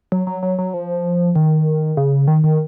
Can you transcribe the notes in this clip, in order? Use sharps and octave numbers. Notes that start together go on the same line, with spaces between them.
F#3
F#3
F#3
F#3
F3
D#3
C#3
D#3
D#3